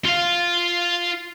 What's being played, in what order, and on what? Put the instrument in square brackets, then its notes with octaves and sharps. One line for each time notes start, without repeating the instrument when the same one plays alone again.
[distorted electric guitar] F4 F5